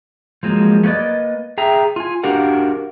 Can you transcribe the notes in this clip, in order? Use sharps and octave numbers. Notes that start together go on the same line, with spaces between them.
F3 F#3 G#3 A#3
A3 A#3 B4 D5 D#5
G#4 E5 G5 A#5
F4 G#5
D4 F#4 G4 A#4 F5 F#5